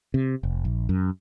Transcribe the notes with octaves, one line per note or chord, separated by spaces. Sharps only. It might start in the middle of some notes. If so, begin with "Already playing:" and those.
C3
F1
A#1
F#2